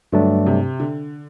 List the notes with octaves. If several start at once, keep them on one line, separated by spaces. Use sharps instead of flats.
G2 D3 F#3 A3 D4
C3
D3